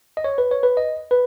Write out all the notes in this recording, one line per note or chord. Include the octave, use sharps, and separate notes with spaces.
D#5
C#5
B4
C#5
B4
D#5
B4